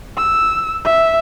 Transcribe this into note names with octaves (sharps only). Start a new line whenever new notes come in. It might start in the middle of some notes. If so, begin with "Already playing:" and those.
E6
E5